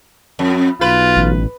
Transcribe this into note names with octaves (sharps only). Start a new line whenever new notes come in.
F2
B1 F4 B4
A1